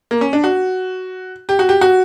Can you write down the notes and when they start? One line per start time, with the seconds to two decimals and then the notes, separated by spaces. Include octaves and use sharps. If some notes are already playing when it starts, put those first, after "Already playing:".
0.11 A#3
0.21 C#4
0.33 D4
0.44 F#4
1.49 G4
1.59 F#4
1.69 G4
1.81 F#4